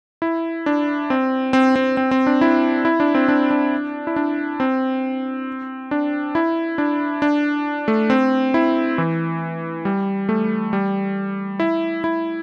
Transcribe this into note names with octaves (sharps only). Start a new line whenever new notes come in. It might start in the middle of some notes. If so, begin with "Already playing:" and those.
E4
D4
C4
C4
C4
C4
C4
D4
E4
E4
D4
C4
D4
D4
E4
D4
C4
D4
E4
D4
D4
A3
C4
E4
E3
G3
A3
G3
E4
E4